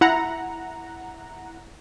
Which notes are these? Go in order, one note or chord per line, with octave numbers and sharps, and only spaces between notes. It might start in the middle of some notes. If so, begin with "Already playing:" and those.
E4 F#5 A#5